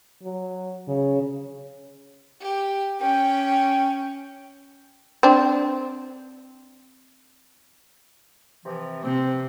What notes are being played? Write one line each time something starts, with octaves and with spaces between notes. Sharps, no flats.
F#3
C#3
G4
C#4 G5
C4 D4
C3 E3 F3
C3 C4